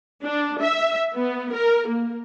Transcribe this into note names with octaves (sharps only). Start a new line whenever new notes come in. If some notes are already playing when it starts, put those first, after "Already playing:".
D4
E5
B3
A#4
A#3